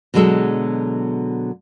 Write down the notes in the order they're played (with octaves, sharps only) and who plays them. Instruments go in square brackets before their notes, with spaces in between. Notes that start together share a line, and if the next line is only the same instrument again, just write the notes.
[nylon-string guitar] B2 D3 F#3 G#3 A4